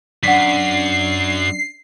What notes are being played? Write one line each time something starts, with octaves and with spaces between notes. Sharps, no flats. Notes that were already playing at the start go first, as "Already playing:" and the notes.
F#2 C#4 D4 D5 F#5 B6 C7